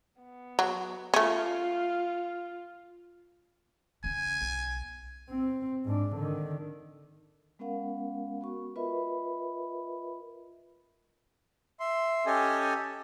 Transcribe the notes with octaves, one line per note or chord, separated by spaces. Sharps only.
B3
F#3
A3 C#4 F4
C#3 C#4 G#5
B1
C4
G#2 D4
D3 D#3
G#3 B3 C#4 A#4 F5 F#5
B3 F#4 C#6
F4 A#4 B4 D#5 E5 B5
E5 C6
C#4 G4 A4 D#5 G#5